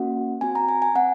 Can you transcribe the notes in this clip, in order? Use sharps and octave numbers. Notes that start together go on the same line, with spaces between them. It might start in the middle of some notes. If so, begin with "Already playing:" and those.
Already playing: A#3 C#4 F#4 F#5
C4 F#4 G#5
A#5
G#5
G#5
C4 F#5